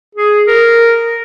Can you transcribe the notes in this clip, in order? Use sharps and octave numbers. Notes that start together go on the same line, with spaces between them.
G#4
A#4